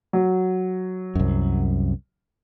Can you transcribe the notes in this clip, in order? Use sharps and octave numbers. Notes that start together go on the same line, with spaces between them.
F#3
C2 F#2